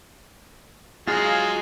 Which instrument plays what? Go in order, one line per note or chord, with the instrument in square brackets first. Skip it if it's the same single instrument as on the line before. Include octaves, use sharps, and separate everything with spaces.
[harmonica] F#3 G#3 [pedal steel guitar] F4 G#4 F5